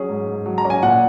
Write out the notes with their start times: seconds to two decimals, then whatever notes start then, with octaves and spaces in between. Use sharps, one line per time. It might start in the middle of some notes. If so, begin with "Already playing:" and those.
Already playing: F#3 C#4 G#4
0.09 G#2
0.27 G#2
0.46 F#3
0.58 A#5
0.65 C#4
0.70 G#5
0.83 A#2 F#5